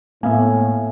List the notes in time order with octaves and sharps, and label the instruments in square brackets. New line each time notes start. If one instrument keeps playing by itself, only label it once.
[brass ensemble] A2 [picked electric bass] A#3 B3 [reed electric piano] E5 F5 G#5